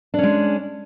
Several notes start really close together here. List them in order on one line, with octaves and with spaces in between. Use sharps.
D4 C#4 G#3